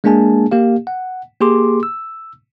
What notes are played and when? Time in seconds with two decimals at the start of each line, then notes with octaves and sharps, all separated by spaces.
0.04 G#3 A#3 D4 G#4 G#5 A5
0.52 A#3 G4 F5
0.87 F#5
1.40 A#3 G4 G#4 C6 D6
1.83 E6